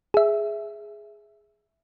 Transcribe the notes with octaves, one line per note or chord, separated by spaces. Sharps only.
G#4 E5